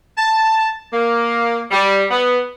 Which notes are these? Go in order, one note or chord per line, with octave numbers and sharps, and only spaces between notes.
A5
A#3
G3
B3